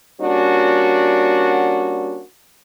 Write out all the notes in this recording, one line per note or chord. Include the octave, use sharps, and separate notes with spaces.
G3 A#3 C#4 D4 F#4